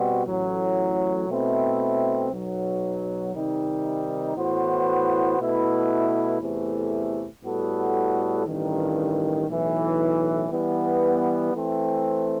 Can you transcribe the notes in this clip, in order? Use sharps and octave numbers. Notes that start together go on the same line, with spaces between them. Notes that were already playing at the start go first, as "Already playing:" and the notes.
Already playing: B2 G3 C4 F#4
A1 A2 F#3
B2 A3 C4 E4
B1 B2 F#3
C3 D#3 G3 D#4
A2 E3 B3 F#4 C5
B2 A3 E4 B4
E2 C3 E3 A3
A2 G3 B3 F#4 A4
A1 G2 D#3
B1 A2 E3
E3 G3 B3
E3 A3 C4